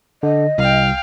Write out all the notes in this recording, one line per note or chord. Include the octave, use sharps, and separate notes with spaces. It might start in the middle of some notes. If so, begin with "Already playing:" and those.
D3 D#5
C2 F5 G5